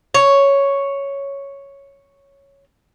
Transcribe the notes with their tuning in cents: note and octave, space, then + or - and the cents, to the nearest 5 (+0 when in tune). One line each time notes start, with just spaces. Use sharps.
C#5 +0